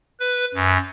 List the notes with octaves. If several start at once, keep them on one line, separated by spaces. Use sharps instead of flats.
B4
F#2